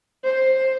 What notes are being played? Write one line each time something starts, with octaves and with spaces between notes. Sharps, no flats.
C5